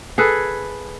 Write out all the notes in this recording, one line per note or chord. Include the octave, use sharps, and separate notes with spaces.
G#4 A4 B4